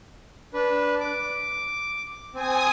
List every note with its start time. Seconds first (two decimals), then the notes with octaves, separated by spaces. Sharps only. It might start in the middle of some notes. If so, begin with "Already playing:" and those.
0.54 D4 B4
1.00 D6
2.34 C4 G#5 D#6